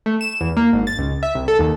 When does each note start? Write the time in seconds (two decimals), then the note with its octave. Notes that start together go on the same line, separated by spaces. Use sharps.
0.06 A3
0.21 E7
0.41 E2
0.57 A#3
0.73 G#1
0.87 A6
0.98 C#2
1.23 E5
1.35 C2
1.48 A4
1.59 D#2